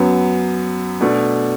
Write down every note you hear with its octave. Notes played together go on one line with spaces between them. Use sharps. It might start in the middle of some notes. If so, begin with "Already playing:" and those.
Already playing: F#2 F#3 B3
B2 A3 D4